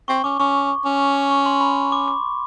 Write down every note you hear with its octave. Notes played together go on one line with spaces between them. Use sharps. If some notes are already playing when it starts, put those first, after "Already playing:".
C4 C#6
C#4 D6
C#4 C#6
C#4
C#6
C6
B5
D6
D6